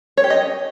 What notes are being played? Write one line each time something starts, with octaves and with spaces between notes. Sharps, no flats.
C#5
G4
D#5